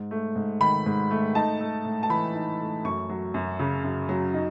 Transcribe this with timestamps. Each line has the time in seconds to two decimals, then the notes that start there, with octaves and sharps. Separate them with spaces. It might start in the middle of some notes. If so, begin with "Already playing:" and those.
Already playing: G#2
0.11 A3
0.35 G#2
0.60 D#3 B5
0.86 G#2
1.11 A3
1.35 D#4 A5
1.60 A3
1.85 A2
2.03 A5
2.09 E3 B5
2.35 D#4
2.60 A3
2.85 F#2 C#6
3.09 F#3
3.34 F#2
3.59 C#3
3.84 F#2
4.09 F#3
4.34 D#4